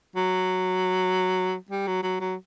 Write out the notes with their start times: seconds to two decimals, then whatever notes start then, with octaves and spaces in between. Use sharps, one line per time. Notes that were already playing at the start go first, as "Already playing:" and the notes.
0.16 F#3
1.71 G3
1.87 F#3
2.03 F#3
2.20 F#3